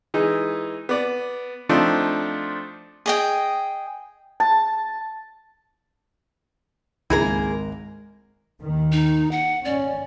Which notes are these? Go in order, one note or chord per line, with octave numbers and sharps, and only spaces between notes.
E3 G#3 D#4
B3 D5 D6
F3 A3 C4 D4 D#4 F4
G#4 D#5 G5
A5
G#1 C#2 A#3 E4 G#4 A#4
D#2 D#3
D#4
F#5
C#4 D5